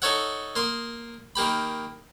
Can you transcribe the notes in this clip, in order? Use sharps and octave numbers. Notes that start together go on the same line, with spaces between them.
D#4 A4 C#5 E5 F#5
A#3 C6 D#6
D#3 A#3 G4 B5